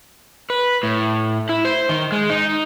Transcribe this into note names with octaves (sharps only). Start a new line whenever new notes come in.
B4
A2
E4
C5
D#3
G#3
D#4